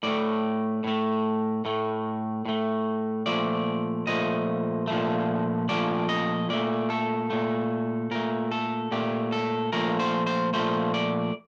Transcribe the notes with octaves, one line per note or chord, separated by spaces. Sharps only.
A2 A3 D5
A2 A3
A2 A3
A2 A3
A#2 F3 A3 D5
A#2 F3 A3 D#5
A#2 F3 A3
A#2 F3 A3 D5
D#5
A#2 A3 D5
A4
A#2 A3
A#2 A3 A#4
A4
A#2 A3 G4
A4
A#2 F3 A3 A#4
C5
C5
A#2 F3 A3 C5
D5